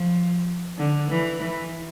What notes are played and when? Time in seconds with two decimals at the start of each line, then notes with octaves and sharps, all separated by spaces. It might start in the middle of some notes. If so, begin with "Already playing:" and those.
Already playing: F3
0.78 D3
1.10 E3
1.41 E3